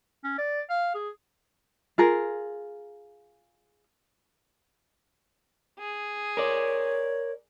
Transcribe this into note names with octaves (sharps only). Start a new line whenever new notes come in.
C#4
D5
F5
G#4
F4 G#4 A#4
G#4
A#4 C#5 D5